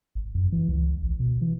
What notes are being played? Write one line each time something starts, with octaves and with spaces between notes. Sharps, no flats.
G#1
F#2
E3
C#2
A1
B2
E3